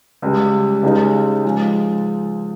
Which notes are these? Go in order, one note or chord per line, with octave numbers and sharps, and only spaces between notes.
C#2 C#3 G3
C#2 C#3 G#3 D#4 G4
F3 G#3